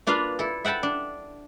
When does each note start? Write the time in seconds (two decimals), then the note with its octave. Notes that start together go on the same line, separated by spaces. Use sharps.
0.07 A#3 D4 F4 B4 F5
0.39 E4 A4
0.65 E5 F#5 G5 A5 B5
0.83 D4